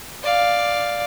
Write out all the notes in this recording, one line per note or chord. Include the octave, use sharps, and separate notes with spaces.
D5 F5